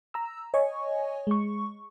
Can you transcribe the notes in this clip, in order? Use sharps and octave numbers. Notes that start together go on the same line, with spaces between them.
A#5 E6
C#5 D#5 G#5 C#6
G#3 C#6